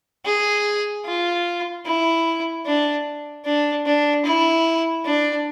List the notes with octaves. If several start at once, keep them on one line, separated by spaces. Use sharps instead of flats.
G#4
F4
E4
D4
D4
D4
E4
D4